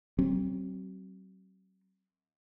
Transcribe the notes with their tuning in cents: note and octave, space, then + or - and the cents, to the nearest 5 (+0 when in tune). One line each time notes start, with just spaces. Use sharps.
F#3 +40 C4 +25